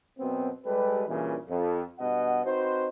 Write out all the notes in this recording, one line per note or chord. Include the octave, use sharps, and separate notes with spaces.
F#2 B2 B3 C4
G3 G#3 G4 A4 B4
G2 A#2 C#3 E3
F2
G2 B2 D#5 F#5
C4 D#4 F#4 B4 C5